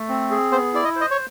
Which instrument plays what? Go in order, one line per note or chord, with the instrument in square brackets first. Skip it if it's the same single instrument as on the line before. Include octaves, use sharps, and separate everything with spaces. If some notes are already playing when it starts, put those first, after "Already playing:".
Already playing: [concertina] A3
C4
G#4
[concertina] B3 [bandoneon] C5
[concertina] E4 [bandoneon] D5
[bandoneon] D#5
[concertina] C5
[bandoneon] D#5
C#5